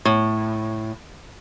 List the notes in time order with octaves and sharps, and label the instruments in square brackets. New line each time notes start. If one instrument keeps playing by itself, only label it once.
[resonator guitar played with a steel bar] A2